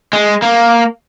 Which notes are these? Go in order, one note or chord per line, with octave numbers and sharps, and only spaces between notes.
G#3
A#3